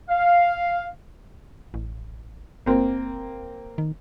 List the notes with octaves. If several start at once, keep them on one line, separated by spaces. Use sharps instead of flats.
F5
A1
F#1 A#3 C4
D#3